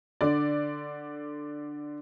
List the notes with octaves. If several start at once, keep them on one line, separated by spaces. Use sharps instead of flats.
D3 D5